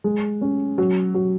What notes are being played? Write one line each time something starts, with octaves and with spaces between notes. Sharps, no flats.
G#3
C#4
F#3
F#3